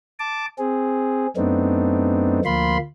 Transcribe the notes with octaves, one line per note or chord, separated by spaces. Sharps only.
A5 D6
C4 G#4
F#2 A3 B3 C4 D4 D#4
D2 F3 A#3 F4 B5 C6